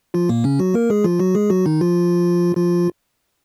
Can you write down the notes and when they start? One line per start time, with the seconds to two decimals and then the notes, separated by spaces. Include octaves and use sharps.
0.14 F3 F4
0.29 A#2 A#3
0.44 C#3 C#4
0.59 F#3 F#4
0.74 A#3 A#4
0.90 G#3 G#4
1.04 F3 F4
1.20 F#3 F#4
1.35 G#3 G#4
1.50 F#3 F#4
1.66 D#3 D#4
1.81 F3 F4
2.56 F3 F4